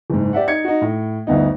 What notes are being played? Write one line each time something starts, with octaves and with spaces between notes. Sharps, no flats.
F#1 G#2
G4 D5 E5 F#5
D#4 G#6 C#7
D#4 F#4
A2
G1 D2 B3 D#4